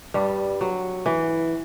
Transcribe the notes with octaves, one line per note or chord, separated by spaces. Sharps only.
G2 G3
F#3
E3